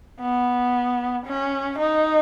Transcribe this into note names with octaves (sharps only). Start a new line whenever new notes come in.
B3
C#4
D#4